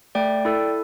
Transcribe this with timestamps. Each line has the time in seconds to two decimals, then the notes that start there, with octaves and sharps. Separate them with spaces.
0.15 A3 D5 G5
0.45 E4 A4